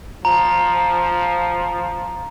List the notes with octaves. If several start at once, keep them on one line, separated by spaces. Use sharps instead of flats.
F3 A#5